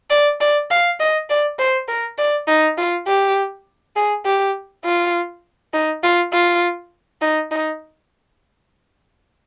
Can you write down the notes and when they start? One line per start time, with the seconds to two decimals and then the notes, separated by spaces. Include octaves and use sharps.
0.10 D5
0.40 D5
0.71 F5
1.00 D#5
1.30 D5
1.59 C5
1.88 A#4
2.18 D5
2.48 D#4
2.78 F4
3.07 G4
3.96 G#4
4.25 G4
4.84 F4
5.74 D#4
6.03 F4
6.33 F4
7.22 D#4
7.51 D#4